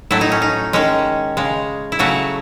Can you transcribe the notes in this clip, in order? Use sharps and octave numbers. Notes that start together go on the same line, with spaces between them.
A2 F#3 A3 E4
D#4
C#4
D#4
D#3 G#3 C#4
C#3 G#3
E4
C#3 F#3 A3 F#4